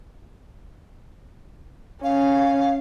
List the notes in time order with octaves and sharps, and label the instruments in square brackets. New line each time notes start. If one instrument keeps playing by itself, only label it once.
[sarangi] C#4 [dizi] F5